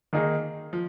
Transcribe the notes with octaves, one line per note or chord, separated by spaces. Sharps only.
D#3 A#3 D#4 G#4
F3